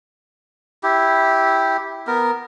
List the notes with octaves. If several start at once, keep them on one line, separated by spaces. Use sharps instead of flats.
E4 G4
B3 A#4